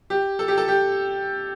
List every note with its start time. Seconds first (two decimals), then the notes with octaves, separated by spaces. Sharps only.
0.10 G4
0.39 A4
0.48 G4
0.58 A4
0.68 G4